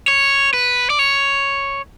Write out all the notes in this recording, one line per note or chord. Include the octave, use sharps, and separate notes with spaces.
C#5
B4
D5
C#5